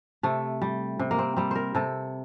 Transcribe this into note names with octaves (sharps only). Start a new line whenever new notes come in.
C3 A3
G3
C3
A#3
C4
G3 C4
A#4 C5
C3 A4